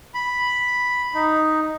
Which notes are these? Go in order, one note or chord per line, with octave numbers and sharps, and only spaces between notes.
B5
D#4